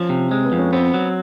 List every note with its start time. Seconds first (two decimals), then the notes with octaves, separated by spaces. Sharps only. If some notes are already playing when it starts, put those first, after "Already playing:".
Already playing: F3 C#4
0.09 C3
0.30 G#3 C4
0.44 B3
0.52 F2
0.58 C#4
0.73 B3 C4
0.94 F#3